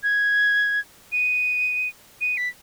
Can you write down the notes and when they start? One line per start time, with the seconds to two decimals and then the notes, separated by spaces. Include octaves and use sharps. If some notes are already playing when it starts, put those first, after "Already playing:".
0.03 G#6
1.12 D#7
2.21 D#7
2.37 B6